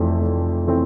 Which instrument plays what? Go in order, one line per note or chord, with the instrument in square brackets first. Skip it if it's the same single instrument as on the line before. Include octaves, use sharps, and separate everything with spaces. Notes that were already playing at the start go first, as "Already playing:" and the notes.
Already playing: [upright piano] F1 F2 E3 A3 C4
F1
E3 A3 C4